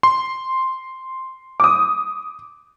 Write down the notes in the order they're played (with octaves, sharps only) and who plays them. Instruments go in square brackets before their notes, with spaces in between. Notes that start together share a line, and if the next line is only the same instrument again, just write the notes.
[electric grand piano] C6
[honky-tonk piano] D6 D#6